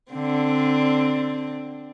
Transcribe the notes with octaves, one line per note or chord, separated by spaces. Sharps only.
D3 C4